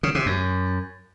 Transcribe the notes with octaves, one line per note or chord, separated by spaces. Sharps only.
C#3
C3
F#2